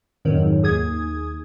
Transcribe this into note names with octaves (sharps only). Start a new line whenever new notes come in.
F2 G#2 D#3 F#3
D#2 G#4 D#6 G#6